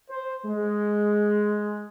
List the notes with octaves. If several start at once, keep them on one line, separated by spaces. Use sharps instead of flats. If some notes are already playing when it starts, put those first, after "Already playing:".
C5
G#3